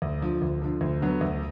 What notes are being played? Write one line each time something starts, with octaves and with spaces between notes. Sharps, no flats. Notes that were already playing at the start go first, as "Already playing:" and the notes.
D2
D3 F3
D2
D3 F3
D2
D3 F#3 B3
D2